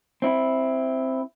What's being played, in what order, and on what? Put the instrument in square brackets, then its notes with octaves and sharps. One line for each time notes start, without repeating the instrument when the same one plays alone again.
[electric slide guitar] C4 E4